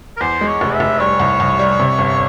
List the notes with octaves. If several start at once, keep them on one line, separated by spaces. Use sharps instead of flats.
A#4
E2 C5
G#3
C#5
F1
E5
F1
G3 C#5
C2
C2
G3
C3
G1